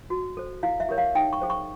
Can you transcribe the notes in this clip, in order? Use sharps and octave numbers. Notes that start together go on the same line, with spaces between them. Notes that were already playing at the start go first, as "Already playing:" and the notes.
F#4
A4 C5
E4 F5
E5
G4 A#4 C#5
F5
D#4 G5
C#6
G#4 C5
C#6